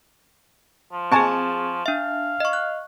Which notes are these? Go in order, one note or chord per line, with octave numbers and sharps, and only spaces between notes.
F3
C4 G#4 G#5 A5 C#6
D4 E5 F5
D#5 C#6
F#6